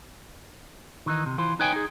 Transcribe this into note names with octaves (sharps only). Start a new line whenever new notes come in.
D#3 E3 D#4
C3
E3 F4 C5
D#4 B4 C#5 D#5 G5 G#5
D#4 G#4